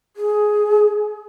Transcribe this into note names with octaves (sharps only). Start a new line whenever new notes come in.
G#4